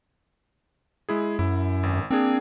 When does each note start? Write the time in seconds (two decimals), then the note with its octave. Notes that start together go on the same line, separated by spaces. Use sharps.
1.09 G#3 E4 G#4
1.39 F#2 E4
1.83 G#1
2.10 A#3 C4 D4 G#4